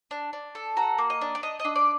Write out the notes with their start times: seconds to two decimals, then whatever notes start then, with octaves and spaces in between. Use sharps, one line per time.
0.11 D4
0.33 D4
0.55 A4
0.77 F#4 A#5
0.98 A#3
1.10 D#5
1.21 D4
1.35 D5
1.43 D4 D#5
1.59 D#5
1.65 D4
1.75 D5